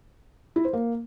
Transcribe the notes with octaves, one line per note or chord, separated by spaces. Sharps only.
E4
C5
A#3